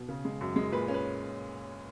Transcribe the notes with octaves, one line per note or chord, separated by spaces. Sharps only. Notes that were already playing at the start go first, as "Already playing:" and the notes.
Already playing: B2
C#3
G#3
F#2
G#3
A#2 B4
C#4
B4